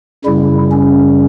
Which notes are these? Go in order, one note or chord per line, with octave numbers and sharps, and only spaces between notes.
F#2 C#3 G3 E4
C#4